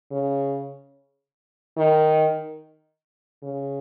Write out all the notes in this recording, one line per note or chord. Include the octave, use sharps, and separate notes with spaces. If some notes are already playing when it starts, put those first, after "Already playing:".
C#3
D#3
C#3